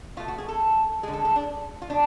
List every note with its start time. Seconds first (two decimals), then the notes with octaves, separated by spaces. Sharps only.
0.17 B2 F4
0.20 A3
0.28 F#4
0.38 G#4
0.48 A4
1.03 D3 G#3 G#4
1.13 A4
1.25 A4
1.36 D4
1.82 F4
1.90 B2 D4